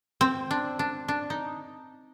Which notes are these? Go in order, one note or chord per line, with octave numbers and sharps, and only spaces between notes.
C4
D4
D4
D4
D#4